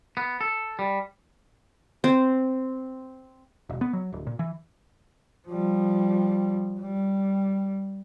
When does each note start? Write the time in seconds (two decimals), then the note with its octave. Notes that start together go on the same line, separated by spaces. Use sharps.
0.17 B3
0.41 A4
0.79 G3
2.04 C4
3.70 E1
3.81 B3
3.93 F#3
4.12 D1
4.27 A#2
4.39 E3
5.48 F3 G3
6.81 G3